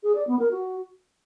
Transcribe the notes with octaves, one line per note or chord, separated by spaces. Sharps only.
G#4
D5
B3
A#4
F#4